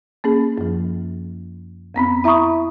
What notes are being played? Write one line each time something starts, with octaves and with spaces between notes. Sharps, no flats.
A#3 C#4 G#4
F#2 F3
F2 B3 C4 B5
E4 E5 A#5 B5 C#6 D#6